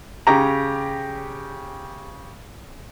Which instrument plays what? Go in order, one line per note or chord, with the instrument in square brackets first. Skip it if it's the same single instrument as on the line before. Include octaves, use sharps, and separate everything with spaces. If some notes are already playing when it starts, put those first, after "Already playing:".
[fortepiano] C#3 G4 A#5